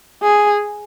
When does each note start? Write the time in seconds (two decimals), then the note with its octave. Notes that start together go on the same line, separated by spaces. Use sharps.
0.23 G#4